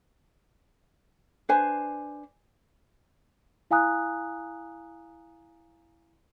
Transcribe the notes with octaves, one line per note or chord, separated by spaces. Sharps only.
D4 B4 C5 G#5
E4 F5 G#5 A#5 D#6 F#6